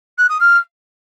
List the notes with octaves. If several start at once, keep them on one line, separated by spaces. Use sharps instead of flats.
F#6
D#6
F6